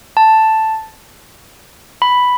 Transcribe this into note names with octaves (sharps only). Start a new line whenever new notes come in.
A5
B5